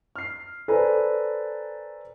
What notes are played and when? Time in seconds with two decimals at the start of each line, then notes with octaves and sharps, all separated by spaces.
0.16 F6 C7
0.68 A4 B4 C5 D5 G#5 A#5